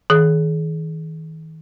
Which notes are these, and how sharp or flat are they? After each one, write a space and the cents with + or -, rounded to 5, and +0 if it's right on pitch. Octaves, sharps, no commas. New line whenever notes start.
D#3 +40 G#4 +25